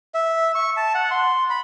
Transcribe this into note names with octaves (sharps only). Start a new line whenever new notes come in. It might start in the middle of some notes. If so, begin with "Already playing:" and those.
E5
C#6
A5
F#5
C6
B5